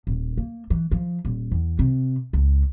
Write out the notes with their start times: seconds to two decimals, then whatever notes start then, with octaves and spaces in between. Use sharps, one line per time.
0.07 D#1
0.37 A#3
0.70 E3
0.91 F3
1.25 D#1
1.51 E2
1.79 C3
2.33 C#2